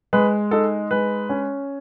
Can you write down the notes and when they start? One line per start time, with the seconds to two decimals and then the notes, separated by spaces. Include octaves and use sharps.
0.13 G#3 B4
0.51 D#4 A4
0.91 G#3 B4
1.29 C#4